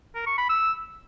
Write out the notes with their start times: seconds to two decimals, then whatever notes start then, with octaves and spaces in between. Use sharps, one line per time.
0.15 A#4
0.26 C#6
0.38 B5
0.49 E6